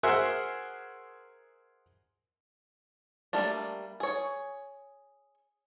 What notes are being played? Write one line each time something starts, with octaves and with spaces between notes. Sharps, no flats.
F#4 G#4 A#4 C5 E5 F#5
G3 A3 A#3 D4
G#4 C#5